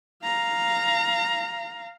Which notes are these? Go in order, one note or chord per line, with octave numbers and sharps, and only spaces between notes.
F5 A#5